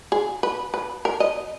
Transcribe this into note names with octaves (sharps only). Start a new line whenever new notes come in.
G#4
B4
B4
A#4
D#5